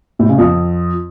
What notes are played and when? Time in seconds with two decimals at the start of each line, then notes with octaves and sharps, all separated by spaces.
0.19 A2
0.29 C#3
0.38 F2